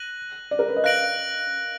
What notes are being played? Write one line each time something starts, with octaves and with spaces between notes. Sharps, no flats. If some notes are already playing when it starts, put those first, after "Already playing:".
Already playing: F#6 A#6 D#7 F#7
D5
A#4
B4
D#5
F5 F#6 A#6 D7 F#7